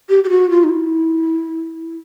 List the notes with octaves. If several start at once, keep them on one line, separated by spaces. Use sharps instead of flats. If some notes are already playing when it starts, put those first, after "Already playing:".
G4
G4
F#4
F4
D#4
E4